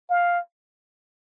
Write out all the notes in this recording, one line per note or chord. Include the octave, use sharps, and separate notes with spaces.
F5